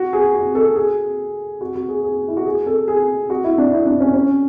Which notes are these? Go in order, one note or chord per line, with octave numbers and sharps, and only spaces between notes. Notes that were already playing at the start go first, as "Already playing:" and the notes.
Already playing: F#4
G#4
F#4
A4
G#4
F#4
F#4
G#4
G#4
E4
F#4
G#4
A4
G#4
F#4
E4
D4
E4
D4
C#4
C#4